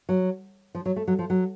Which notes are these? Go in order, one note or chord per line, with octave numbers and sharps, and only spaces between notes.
F#3
F3
F#3
A3
F#3
F3
F#3